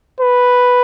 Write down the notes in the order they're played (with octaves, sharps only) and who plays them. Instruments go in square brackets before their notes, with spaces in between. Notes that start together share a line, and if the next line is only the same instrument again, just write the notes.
[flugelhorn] B4